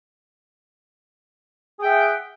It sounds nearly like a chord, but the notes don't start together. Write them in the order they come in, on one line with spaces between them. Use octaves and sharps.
G#4 G5 E5 F#5